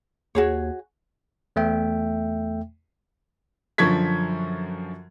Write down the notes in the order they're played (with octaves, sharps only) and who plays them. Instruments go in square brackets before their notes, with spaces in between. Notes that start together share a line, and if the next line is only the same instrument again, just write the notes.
[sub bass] D#2 [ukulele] F#4 G#4 C#5
[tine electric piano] E2 A3 E5 G5
[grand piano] F#2 D3 F3 C#6 G#6 B6